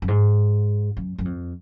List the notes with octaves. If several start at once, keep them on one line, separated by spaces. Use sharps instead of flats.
F#2
G#2
F#2
F#2
F2